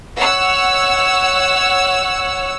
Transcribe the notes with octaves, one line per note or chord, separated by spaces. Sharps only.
C#5 F#5 E6